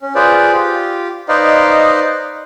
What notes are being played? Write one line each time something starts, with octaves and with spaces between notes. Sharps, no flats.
C#4
F4 G#4 B4 C5 D5
F4 G4
D#4 B4 C5 D5 D#5 F5